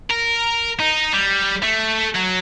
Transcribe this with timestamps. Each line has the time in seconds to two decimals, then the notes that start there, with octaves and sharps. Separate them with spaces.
0.11 A#4
0.80 D#4
1.14 G3
1.63 A3
2.15 F#3